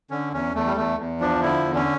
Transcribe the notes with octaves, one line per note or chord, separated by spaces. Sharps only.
D3 C#4
E2 C#4
E2 A3
G3
E2 A3
E2
F3 D4
D3 E4
E2
C#4